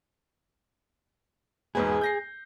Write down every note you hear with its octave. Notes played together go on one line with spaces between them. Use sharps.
E1 G#2 B3 G#4
G6 A#6 C7